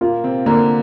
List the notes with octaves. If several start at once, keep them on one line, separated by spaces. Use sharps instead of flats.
A#2 A#3 F4
C3 C4
D3 A#3 D4